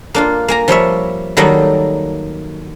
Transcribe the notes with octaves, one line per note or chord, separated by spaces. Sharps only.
A#3 D4 F4
A#3 G#5 A#5
F3 G3 C#5 E5
D#3 F#3 G3 A#3 D#4 A4